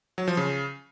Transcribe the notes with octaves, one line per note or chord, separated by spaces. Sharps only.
F#3
F3
C#3